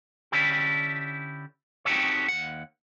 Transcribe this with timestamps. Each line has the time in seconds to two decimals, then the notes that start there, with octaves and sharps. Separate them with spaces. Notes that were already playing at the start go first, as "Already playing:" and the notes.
0.32 D3 C#4 D4 E4 G4
1.85 C4 D#4 F#4 G4 A4 C#5
2.28 D#2 F#5